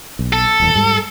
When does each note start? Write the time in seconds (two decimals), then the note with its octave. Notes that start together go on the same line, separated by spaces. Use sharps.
0.19 B1
0.33 A4
0.60 D#1 B1 E2
0.75 G#2 G3